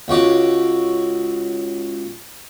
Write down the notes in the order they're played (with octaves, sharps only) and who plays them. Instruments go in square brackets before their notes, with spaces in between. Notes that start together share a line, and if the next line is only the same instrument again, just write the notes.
[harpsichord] C#2 C#4 F#4 D6